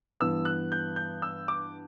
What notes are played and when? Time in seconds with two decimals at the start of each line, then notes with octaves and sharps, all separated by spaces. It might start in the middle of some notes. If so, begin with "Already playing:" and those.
0.20 G2 E3 B3 E6
0.45 F#6
0.72 G6
0.96 G6
1.22 E6
1.48 D6